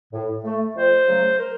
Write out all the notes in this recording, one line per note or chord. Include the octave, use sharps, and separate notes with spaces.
A2
A3
F2 C5
C#3 F#3 A3
A#4